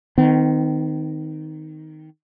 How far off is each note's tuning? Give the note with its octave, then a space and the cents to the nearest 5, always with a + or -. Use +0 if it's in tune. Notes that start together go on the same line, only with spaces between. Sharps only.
D#3 +0 C4 -35